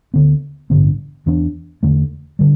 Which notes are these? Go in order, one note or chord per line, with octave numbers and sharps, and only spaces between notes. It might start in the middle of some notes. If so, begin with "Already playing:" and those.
D2 D3 B3
A1 G2 D3 B3
E2 E3 B3 D4
E2 D3 A3
D3 G3